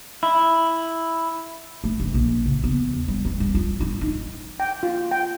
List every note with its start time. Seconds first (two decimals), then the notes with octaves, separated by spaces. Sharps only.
0.23 E4
1.84 A3
2.00 F#1
2.14 A#1
2.46 C#3
2.64 B3
2.94 E2
3.08 G3
3.25 C4
3.40 G3
3.55 F4
3.81 E4
4.01 D#4
4.60 G5
4.83 F4
5.11 G5